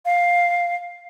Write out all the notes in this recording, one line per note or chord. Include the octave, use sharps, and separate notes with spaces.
F5